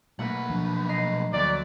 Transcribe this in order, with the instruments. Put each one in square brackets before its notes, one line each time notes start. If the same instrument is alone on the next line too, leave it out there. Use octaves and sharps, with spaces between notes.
[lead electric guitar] B1 B4 [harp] A3 A#3 F#5
[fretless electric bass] F3 D4
[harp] D#5 A#5 C7
[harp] D2 [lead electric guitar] F#3 [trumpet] D5